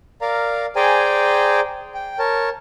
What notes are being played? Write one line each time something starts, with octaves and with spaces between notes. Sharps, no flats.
A#4 D5 F5 A#5
G#4 C5 D5 G5 G#5 A#5
G5
A#4 C#5 A5